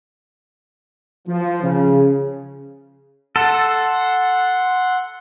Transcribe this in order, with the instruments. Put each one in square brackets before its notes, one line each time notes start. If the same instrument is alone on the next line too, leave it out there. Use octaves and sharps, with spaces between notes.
[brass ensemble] F3
C#3
[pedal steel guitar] A4 [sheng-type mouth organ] F#5 C6